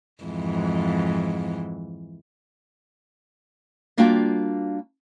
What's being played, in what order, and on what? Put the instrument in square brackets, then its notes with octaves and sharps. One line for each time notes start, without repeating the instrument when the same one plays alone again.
[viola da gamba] F2 G#2 E3
[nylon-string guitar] G3 A#3 D4 F4 F#4 G5